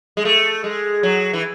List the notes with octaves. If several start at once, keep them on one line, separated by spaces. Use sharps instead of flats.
G#3
A3
G#3
F#3
E3